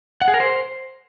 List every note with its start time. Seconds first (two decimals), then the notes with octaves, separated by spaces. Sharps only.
0.21 F#5
0.28 G#4
0.34 A#4
0.40 C5